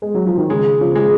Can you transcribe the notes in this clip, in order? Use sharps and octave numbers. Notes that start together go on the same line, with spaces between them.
G#3
F#3
F3
D#3
C#3 G#3
C#3 F3
G#3